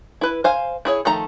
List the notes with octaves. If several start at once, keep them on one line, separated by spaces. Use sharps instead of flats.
E4 B4
C5 F5 G#5
E4 G#4 C#5
D#3 F3 A3 A#5